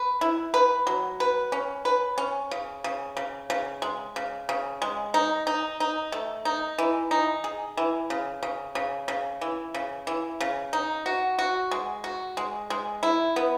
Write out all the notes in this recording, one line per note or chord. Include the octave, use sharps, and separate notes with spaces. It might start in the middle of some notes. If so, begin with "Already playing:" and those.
Already playing: B4
E4
B4
F#3
B4
C#4
B4
C#4
C#3
C#3
C#3
C#3
G#3
C#3
C#3
G#3
D#4
D#4
D#4
A3
D#4
E3
D#4
G#4
E3
C#3
C#3
C#3
C#3
E3
C#3
E3
C#3
D#4
F#4
F#4
G#3
F#4
G#3
G#3
E4
B3